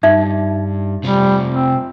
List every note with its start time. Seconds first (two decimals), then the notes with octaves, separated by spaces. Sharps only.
0.03 G2 D#4 E5
1.04 C3 G3 F4
1.50 C4